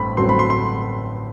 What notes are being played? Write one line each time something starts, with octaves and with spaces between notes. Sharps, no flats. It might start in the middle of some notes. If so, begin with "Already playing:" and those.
Already playing: A1 G2 A3 C4 B5
A1 G2 F#3 A3 C4 C6
B5
C6
C6